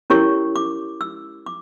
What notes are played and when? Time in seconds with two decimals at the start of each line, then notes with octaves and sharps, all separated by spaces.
0.10 C#4 E4 G4 A#4 C#5 C#6
0.56 D6
1.01 E6
1.46 D6